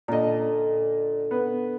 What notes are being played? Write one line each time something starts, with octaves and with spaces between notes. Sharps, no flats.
A#2 D3 D5 D#5
B3